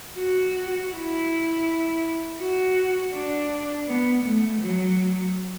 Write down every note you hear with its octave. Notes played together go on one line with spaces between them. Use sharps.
F#4
E4
F#4
D4
B3
A3
F#3